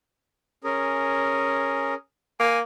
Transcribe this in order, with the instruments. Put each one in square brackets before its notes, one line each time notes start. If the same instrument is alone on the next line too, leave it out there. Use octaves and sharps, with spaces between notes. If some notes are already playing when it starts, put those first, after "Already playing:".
[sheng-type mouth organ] C#4 G#4 A#4
[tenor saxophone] A#3 [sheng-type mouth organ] G#5